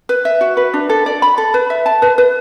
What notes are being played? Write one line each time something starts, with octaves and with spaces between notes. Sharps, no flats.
B4
E5
F#4
B4
D4
A4
D5
B5
A4
B4
E5
A5
B4
B4